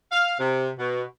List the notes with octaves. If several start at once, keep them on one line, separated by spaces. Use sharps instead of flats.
F5
C3
B2